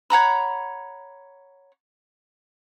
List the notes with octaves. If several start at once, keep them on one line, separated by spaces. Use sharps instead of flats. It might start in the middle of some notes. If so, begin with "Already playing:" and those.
C#5 F#5 A#5 B5